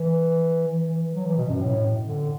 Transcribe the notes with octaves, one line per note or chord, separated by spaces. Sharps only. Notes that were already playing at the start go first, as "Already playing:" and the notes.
Already playing: E3
E3
E3
F#3
E3
B2
F#2
A2
D3